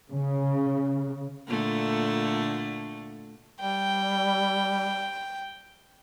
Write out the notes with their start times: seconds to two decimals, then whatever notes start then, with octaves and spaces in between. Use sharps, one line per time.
0.12 C#3
1.47 A#2 D3 A3
3.61 G3 G5